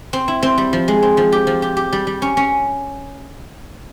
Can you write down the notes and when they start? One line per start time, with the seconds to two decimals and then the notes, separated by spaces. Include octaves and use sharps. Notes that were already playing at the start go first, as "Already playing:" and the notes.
0.13 C4
0.28 E4
0.43 C4
0.58 G3
0.73 F3
0.88 G#3
1.03 C4
1.17 F3
1.32 G4
1.47 F3
1.62 G4
1.77 G4
1.93 G3
2.07 G3
2.22 C#4
2.37 C#4